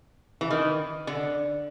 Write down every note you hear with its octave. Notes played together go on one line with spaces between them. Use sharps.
E3
D#3
D3